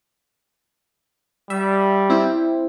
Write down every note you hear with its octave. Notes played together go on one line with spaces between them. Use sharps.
G3 E5
C4 E4